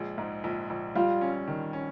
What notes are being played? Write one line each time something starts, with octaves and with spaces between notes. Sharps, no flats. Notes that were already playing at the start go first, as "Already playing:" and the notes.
Already playing: A#1 G#3
G#2
A#1
A#1
G3 F4
C#4
D#3
C#4